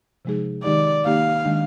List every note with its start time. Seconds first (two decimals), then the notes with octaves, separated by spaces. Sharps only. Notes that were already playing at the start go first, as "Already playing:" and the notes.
0.25 C3 F3 G#3 D#4 G#4
0.64 D#3 G#3 D#4 G4 D5
1.05 D#3 A#3 D#4 G4 F5
1.45 D#3 G#3 D4